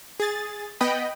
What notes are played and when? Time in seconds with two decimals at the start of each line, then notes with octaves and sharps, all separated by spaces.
0.20 G#4 A6
0.81 B3 D#5 G5 B5